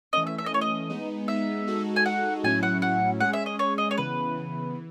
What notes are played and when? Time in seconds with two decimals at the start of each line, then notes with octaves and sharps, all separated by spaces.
0.13 E3 A3 C#4 D#5
0.27 E5
0.38 E5
0.46 D#5
0.52 E3 A3 C#4 C#5
0.61 D#5
0.90 G#3 B3 D#4
1.28 G#3 B3 D#4 E5
1.67 G#3 D#4 F#4 A4
1.96 G#5
2.05 G#3 D#4 F#4 A4 F#5
2.44 A2 F#3 C#4 E4 G#5
2.63 F#5
2.82 A2 F#3 C#4 E4 F#5
3.20 G#3 C#4 G#4 F#5
3.33 E5
3.46 D#5
3.59 G#3 C#4 G#4 C#5
3.78 D#5
3.91 C#5
3.97 C#3 E3 B3 B4
4.36 C#3 E3 B3
4.75 E3